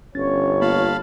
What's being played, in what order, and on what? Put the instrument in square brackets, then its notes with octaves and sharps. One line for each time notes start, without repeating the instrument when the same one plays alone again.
[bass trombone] G1 [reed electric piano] C#4 A6 [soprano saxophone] C#5
[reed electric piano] A#3 B3 F4 [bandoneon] F5 A5 B5